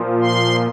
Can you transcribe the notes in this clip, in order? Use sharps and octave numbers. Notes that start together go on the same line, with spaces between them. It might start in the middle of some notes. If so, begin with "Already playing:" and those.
Already playing: A#2 F3
C6